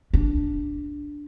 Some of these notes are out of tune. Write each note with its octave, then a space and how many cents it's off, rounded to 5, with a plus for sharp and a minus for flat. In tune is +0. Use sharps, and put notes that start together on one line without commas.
D4 -5